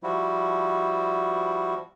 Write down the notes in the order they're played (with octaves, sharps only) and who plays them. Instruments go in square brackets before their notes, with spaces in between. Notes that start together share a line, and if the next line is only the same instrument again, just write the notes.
[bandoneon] F3 G3 E4 F#4